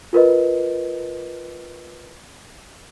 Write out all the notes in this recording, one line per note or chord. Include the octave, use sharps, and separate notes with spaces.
F4 A#4 B4 D#5